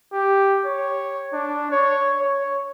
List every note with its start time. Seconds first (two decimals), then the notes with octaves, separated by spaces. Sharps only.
0.13 G4
0.66 C#5
1.33 D4
1.71 C#5
2.20 C#5